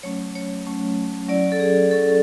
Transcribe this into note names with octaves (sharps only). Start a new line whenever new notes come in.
F#3 A3 C#4 C#5
C#5
F#3 A3 C#4
F#3 C#4 E4 D5
A4
G#4
F#3 C#4 E4 A4